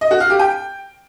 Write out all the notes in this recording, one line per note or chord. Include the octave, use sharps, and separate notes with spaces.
D#5
F#4
F5
G4
G5